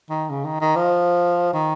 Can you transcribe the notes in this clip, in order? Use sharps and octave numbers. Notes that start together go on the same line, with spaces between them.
D#3
C#3
D#3
D#3
F3
D#3